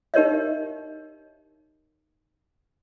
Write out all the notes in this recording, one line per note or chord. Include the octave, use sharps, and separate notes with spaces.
D#4 G4 A#4 C#5 D#5 E5